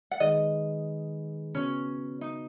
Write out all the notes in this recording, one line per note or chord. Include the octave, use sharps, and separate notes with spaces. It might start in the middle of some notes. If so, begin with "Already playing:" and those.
F#5
D#3 G#3 D#4 G#4 B4 D#5
C#3 B3 C#4 F#4 B4
D#4